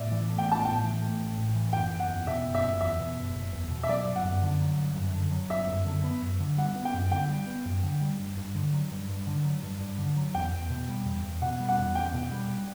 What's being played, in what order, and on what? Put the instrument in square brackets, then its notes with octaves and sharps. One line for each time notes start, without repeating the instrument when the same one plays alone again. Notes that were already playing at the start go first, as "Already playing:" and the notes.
Already playing: [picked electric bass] A2 [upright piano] D5 E5
[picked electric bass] E3
A3
[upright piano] G5
[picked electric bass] A1 [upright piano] A5
[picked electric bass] A2 [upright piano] G5
[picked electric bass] E3
A3
A1
A2
E3
[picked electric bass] F#1 [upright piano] G5
[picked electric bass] F#1
[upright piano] F#5
[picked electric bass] E2
[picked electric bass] B2 [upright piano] E5
[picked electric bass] F#1
[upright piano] E5
[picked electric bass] F#1
[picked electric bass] E2 [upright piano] E5
[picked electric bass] B2
F#1
F#1
E2
B2
[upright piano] E5
[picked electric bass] F#3 [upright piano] D5
[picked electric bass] G1
[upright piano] F#5
[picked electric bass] F#2
D3
F#3
G1
F#2
D3
F#3
[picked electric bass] G1 [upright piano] E5
[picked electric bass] F#2
D3
B3
F#2
D3
[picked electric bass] G3 [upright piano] F#5
[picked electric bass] B3
[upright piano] G5
[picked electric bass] F#2
[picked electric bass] D3 [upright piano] G5
[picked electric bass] G3
B3
F#2
D3
G3
G2
G2
D3
F#3
G2
G2
D3
F#3
G2
G2
D3
F#3
[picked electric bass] E2 [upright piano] G5
[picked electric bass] E2
B2
G3
E2
E2
[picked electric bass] B2 [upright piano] F#5
[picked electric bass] G3
[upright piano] F#5
[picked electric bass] E2
[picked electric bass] E2 [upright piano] G5
[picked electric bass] B2
G3